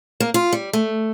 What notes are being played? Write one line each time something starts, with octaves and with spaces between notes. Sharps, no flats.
A#3
F4
G3
A3